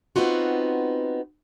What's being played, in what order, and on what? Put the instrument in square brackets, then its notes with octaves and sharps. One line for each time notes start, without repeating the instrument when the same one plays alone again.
[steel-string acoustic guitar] B3 C4 D#4 F4 F#4